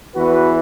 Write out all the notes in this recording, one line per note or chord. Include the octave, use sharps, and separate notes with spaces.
E2 E3 F#4 B4